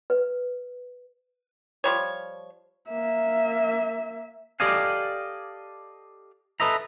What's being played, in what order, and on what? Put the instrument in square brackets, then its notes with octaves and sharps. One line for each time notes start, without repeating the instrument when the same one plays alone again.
[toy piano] B4
[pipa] F3 G3 C#5
[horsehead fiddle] A#3 E5
[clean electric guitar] G4 A4 D5 D#5 F5 G#5
A4 B4 D#5 E5 A#5